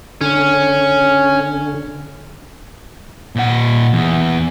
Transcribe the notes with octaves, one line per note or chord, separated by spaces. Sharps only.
D3 C#4
A#2 F#5
E2